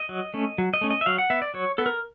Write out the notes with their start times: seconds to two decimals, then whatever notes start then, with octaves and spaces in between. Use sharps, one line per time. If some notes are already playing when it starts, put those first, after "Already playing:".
Already playing: D#5
0.09 F#3
0.34 A3 C#4
0.58 F#3
0.74 D#5
0.81 A3 C#4
0.91 D#5
1.01 E5
1.06 F#3 F5
1.18 F#5
1.30 B3 E5
1.42 D5
1.54 F#3 C#5
1.78 B3 A4
1.86 A#4